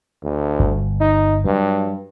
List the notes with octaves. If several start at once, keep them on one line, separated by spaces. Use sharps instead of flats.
D2
G1
D#4
G2 F#3